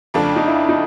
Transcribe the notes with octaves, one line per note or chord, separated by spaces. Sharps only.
F2 C#3 F3 A3 D4
D#4
E4
D#4